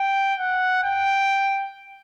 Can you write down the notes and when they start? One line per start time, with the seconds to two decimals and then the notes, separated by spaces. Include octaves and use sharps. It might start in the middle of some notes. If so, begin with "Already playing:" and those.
Already playing: G5
0.39 F#5
0.84 G5